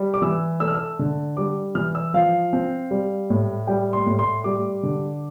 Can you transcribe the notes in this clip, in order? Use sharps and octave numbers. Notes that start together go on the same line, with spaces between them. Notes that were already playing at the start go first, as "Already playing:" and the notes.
Already playing: G3
D6
E3 E6
A3 E6
F6
E6
D3
G3 D6
E3 F6
E6
F3 F5
C4
G3
A2
G3 G5
C6
A2
C6
G3 D6
D3